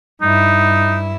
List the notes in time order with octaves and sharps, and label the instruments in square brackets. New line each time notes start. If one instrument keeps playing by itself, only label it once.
[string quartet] G2 E4 [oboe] D#4